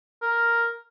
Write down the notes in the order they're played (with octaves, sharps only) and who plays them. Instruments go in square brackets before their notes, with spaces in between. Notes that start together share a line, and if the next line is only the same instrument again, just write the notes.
[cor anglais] A#4